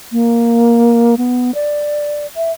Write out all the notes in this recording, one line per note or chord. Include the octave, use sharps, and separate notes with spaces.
A#3
B3
D5
E5